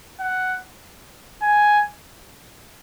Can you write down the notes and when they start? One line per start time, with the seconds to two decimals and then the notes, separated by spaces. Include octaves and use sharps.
0.20 F#5
1.43 G#5